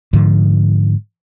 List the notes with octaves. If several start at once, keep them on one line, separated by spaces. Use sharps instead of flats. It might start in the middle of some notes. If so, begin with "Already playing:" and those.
G#2 D3 F3